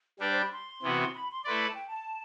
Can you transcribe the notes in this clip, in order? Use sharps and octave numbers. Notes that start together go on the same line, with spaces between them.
G3 D4 G4 B4 D5
C5
B5
C6
C3 E3 B3 F#4
B5
C6
A3 E4 B4 D5 C6
A5
G5
A5